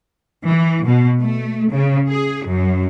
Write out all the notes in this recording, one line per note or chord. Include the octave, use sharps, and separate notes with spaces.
E3
B2
A3
C#3
G#4
F#2